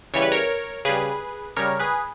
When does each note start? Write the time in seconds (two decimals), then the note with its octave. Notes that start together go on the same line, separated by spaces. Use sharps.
0.14 C#3 E3 G3 C#5
0.22 B4
0.32 A#4 C#5
0.85 C#3 G3 G#4 B4
1.56 C#3 G3 A#4 C#5
1.80 G#4 B4